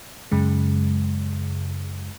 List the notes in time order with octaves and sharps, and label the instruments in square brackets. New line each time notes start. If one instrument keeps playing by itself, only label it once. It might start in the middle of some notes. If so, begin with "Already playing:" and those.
[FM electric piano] F#2 C#3 G#3